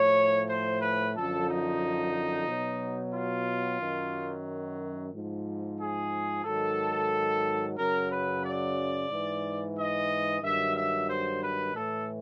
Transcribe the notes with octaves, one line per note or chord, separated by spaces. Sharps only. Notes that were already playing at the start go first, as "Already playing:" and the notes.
Already playing: A2 F3 C#5
C5
B4
F#2 D3 F3 A4
D#4
B2 F#3
F4
F#2 D#3 F#3
G#2 F3
G#4
G#2 D#3 F#3 A4
F#2 C#3 F#3 A#4
B4
D5
G#2 E3
D#5
G2 D#3 F#3 E5
E5
C5
B4
A2 E3 A4